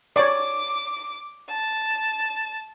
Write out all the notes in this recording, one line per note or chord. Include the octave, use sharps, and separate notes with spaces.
C#5 D5 D6
A5